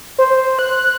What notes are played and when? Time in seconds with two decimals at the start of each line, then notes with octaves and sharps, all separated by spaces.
0.18 C5
0.59 F#6